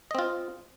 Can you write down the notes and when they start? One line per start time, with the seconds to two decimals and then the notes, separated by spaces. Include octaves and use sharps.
0.11 D#5
0.15 C4
0.19 F4